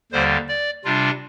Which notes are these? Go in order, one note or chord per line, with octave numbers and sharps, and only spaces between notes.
D#2 D3 G3 C5
D5
C3 G3 D4 F4